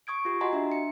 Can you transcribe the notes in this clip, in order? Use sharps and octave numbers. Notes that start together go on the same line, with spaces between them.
C#6 D#6 G#6 D7
F4 G4
F#4 D#5 F#5 G#5 A#5 C6
D4 E5
C#7